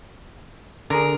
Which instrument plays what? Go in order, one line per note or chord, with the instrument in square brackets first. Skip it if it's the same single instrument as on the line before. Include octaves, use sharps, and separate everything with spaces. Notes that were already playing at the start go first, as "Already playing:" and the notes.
[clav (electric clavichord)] D3 G#4 [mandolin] A#4